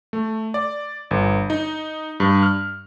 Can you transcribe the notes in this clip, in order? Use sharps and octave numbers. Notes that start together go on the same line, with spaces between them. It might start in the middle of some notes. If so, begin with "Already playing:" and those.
A3
D5
G1
D#4
G2
F6